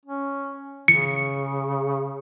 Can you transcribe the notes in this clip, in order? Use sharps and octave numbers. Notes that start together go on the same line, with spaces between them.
C#4
C#3 C#7